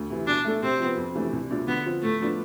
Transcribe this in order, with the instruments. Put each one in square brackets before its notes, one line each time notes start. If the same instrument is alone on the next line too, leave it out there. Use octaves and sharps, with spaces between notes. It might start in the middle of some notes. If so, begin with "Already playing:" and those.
Already playing: [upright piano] D2
C3 E3
[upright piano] B2 [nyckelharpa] D4
[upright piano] A3 D4 A4
[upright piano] C3 [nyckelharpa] C4
[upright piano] F3 B3
F2
C3 E3 A3 D4
C2
B2 A3 D4 F4
[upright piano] D3 [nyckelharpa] B3
[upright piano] F3 C4 F4
[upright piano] A2 [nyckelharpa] A3
[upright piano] F3 B3 D4 F4